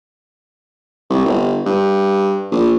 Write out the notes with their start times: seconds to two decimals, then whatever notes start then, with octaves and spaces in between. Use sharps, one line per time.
1.10 C2
1.25 G1
1.66 G2
2.52 A#1